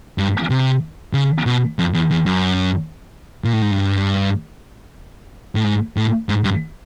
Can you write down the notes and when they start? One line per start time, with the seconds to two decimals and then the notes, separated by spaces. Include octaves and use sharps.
0.18 G2
0.50 C3
1.13 C#3
1.46 B2
1.79 F2
1.94 E2
2.11 E2
2.26 F#2
3.44 A#2
3.53 A2
3.62 G#2
3.71 G2
5.55 A2
5.64 G#2
5.97 A2
6.29 G#2
6.44 G2